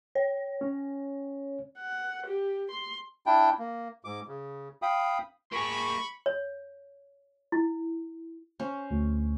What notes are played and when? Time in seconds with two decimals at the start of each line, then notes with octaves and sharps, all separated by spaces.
0.15 C#5
0.61 C#4
1.78 F#5
2.26 G4
2.71 C6
3.26 D4 E4 G5
3.59 A#3
4.04 G#2 D6
4.28 C#3
4.82 F5 G5 B5 D#6
5.52 A#3 G#4 B5 C#6
6.26 C#5
7.52 E4
8.60 C#4 C5
8.91 D2